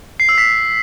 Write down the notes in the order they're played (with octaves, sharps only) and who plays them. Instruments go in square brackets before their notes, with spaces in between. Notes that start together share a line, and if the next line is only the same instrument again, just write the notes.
[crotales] C7
E6
B6